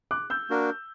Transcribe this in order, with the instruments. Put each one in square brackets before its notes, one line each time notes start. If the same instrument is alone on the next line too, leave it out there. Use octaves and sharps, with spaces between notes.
[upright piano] D6 F#6
E6 G6
[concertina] A#3 D4 F#4 A#4